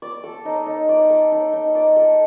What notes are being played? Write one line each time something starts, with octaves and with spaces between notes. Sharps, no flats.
D5
A4
D#4
D#4
D5
A4
D#4
D#4
D5
A4